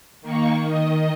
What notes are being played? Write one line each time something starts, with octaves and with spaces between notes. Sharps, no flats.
D#3 A#3 C#6
D#3 D#5